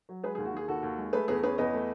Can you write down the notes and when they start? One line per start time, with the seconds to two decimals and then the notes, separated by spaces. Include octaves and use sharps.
0.09 F#3
0.24 G#3 G#4 B4
0.35 D#2 G#4
0.45 F#4
0.54 D#3 G#4
0.68 D#2 F#4 A4
0.83 D#2
0.98 G#3
1.13 A3 G#4 B4
1.28 E2 G#4 B4
1.43 C#4 G#4 B4
1.58 E2 B4 D#5
1.74 A3